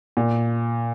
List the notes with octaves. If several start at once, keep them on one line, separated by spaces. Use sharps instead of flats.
A#2